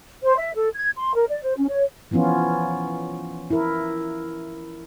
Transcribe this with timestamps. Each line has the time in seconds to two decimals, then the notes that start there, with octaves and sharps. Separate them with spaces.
0.24 C5
0.38 E5
0.56 A4
0.75 G#6
0.97 C6
1.16 A#4
1.29 D5
1.43 C5
1.57 C#4
1.69 C#5
2.11 E3 F3 B3 C#4 F4
3.50 E4 A#4